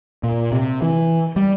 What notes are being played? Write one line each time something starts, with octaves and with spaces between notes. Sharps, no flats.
A#2
C3
E3
G3